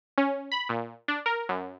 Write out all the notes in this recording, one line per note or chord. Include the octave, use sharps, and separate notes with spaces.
C#4
B5
A#2
D4
A#4
F#2